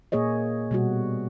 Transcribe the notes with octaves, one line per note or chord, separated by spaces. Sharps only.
A#2 A#3 G#4 C#5 D#5
B2 G3 F#4